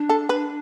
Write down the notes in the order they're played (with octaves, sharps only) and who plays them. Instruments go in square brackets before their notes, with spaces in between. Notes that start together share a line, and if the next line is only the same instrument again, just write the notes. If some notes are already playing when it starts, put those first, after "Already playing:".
Already playing: [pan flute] D4
[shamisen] A4
B4